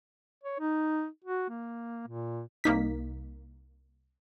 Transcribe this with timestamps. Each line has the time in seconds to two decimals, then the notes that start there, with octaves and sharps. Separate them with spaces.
0.44 C#5
0.59 D#4
1.24 F#4
1.49 A#3
2.07 A#2
2.64 C2 A#3 D#4 B6